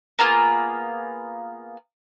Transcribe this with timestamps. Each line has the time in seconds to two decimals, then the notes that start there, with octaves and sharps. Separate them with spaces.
0.19 A#3 B3 F4 G#4